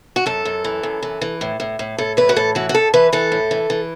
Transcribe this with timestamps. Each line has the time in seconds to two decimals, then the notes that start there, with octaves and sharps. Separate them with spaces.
0.16 F#4
0.26 F#2 A4
0.45 F#2
0.64 E3
0.83 F#2
1.03 E3
1.21 E3
1.41 A2
1.60 A2
1.79 A2
1.98 A2 A4
2.17 E3 B4
2.29 F#4
2.36 A2 A4
2.55 E3 F#4
2.69 F#4
2.74 A2 A4
2.94 E3 B4
3.13 E3 A4
3.32 A2
3.51 E3
3.70 E3